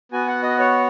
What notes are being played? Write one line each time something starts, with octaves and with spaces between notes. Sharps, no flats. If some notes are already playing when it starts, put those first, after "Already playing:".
B3 F#4 G#5
F#5
D#5
C#5